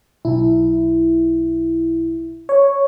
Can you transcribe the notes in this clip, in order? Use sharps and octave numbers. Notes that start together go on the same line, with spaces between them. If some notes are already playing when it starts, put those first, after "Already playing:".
B1 E4
C#5